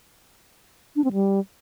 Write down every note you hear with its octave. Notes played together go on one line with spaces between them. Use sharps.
D4
C4
G3